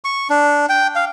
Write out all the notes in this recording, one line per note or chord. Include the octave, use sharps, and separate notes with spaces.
C#6
D4
G5
F5